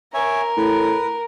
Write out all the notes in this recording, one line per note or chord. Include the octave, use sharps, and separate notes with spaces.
A#4 C#5 E5 G#5
A2 B4